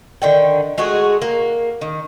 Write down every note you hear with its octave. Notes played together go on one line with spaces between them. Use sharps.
D3 D#3 G5
G#3 A3 F#4 G#4
A#3
D#3